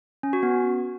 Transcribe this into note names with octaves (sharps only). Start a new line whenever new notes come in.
C#4
F#4
B3